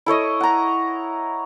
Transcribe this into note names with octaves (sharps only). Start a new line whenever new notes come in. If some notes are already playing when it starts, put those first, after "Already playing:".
E4 A4 C#5 D#5
F#5 A#5